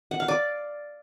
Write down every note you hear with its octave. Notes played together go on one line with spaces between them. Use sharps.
F#5
F5
D5